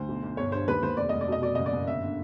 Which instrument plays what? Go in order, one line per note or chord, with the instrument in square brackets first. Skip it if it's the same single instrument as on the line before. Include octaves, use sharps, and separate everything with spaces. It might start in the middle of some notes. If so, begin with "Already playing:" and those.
Already playing: [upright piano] D2 C5
B1
B1
G1 C#5
G2 C5
D#2 B4
D#2 C5
F1 D5
F1 D#5
D5
B2 D#5
B2 D5
F#1 D#5
D5
F#1
G1 E5
D3